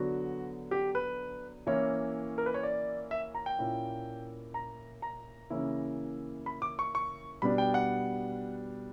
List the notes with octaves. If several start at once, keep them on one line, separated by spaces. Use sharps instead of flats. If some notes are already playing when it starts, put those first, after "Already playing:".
Already playing: D3 F#3 B3 D4 F#4
G4
B4
E3 A#3 C#4 E4 C#5
A#4
B4
C#5
D5
E5
A#5
G5
A#2 A#3 C#4 E4
A#5
A#5
C#3 E3 A#3 C#4 E4
B5
D6
C#6
C#6
B2 G3 B3 D4 B5
G5
F#5